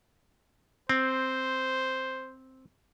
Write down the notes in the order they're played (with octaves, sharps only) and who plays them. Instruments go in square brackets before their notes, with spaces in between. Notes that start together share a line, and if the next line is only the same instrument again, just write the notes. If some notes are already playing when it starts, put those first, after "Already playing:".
[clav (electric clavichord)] C4 [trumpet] C5